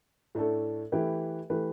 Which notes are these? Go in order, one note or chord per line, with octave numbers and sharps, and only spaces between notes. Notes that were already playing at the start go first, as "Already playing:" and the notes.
A2 A3 D4 A4
E3 A3 E4 G4 B4
E3 A3 G4 B4